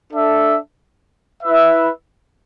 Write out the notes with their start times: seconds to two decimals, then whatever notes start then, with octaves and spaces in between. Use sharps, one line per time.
0.11 D4 A4 E5
1.43 E4 B4 E5